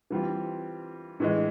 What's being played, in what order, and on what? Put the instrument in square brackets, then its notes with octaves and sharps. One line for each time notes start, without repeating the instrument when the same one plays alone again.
[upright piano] E3 G3 C4 F4
A2 E3 G#3